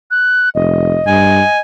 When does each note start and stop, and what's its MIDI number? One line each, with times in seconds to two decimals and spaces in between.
0.11 0.49 90
0.55 0.97 29
0.55 1.61 75
1.07 1.41 43
1.07 1.59 80